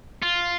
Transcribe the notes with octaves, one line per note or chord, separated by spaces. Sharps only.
F4